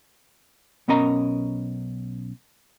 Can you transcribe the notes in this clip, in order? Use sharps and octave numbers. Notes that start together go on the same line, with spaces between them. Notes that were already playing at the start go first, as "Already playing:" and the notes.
B1 B3 C#4 A#4 D#5 A#5